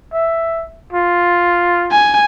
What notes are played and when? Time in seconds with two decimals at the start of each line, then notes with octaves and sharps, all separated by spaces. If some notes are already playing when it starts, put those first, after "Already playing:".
0.13 E5
0.93 F4
1.92 G#5